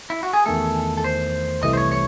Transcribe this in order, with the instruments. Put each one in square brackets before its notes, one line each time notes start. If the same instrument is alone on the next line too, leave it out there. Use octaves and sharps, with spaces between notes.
[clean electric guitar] E4
F#4
G#4
[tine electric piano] E2 D#3 A3 [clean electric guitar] A4
[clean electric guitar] A4
C5
[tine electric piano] C2 C3 E3 A3 [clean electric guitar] D#5
[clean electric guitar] C5
C#5
C#5